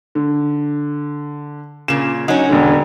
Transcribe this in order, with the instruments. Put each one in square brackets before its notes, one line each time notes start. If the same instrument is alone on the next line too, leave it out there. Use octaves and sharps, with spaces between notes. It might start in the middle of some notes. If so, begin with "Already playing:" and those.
[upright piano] D3
[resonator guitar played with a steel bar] A#2 C#3 [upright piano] E7
[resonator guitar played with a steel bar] F#3 C#4 [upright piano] D#4
[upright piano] E1 D3